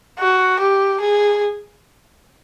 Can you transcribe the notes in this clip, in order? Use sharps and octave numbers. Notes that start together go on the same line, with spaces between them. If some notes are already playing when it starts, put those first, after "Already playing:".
F#4
G4
G#4